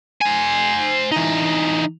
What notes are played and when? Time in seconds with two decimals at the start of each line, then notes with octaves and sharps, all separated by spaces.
0.22 C5 G#5
1.12 E3 D#4